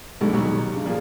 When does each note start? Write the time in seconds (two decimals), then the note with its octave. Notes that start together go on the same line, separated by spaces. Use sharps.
0.21 B1 G#2 B2 D3 G3 G#3
0.33 D#2 B2 F#3 G3
0.73 G2 C#3
0.85 A#2 F3 G#4